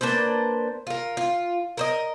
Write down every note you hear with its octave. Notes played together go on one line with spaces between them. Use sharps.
A#3 D4 B4 C5
F4 A#4
F4
A#4 C5 D#5